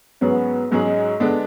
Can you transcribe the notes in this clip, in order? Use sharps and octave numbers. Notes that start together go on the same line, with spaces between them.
G#2 F#3 B3 C#4 G#4
G#2 F#3 G#3 C#4 G#4
D3 G#3 B3 D4